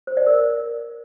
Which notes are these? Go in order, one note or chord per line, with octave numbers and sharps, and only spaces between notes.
C5
D5
A#4